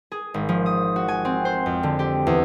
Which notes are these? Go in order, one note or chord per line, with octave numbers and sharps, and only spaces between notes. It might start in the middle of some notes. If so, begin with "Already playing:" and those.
G#4
G#1
F3
D#6
F#4
G#5
C4
C5
F2
D3
G4
E2